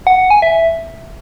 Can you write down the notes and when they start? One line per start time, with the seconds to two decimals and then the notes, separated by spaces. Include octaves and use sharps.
0.07 F#5
0.19 F#5
0.30 G#5
0.42 E5